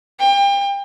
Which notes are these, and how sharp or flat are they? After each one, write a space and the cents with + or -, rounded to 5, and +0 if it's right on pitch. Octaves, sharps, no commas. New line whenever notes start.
G5 +30